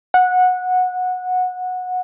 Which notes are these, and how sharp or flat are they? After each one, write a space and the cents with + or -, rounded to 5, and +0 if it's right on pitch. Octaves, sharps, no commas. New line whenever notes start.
F#5 -15